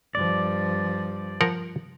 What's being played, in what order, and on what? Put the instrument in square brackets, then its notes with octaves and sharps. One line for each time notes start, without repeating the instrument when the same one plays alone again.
[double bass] G2 F3 [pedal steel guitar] D5
[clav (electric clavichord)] F3 A#4 F#5